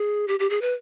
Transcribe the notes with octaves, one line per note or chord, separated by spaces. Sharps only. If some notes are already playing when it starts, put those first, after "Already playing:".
Already playing: G#4
G4
G4
G#4
B4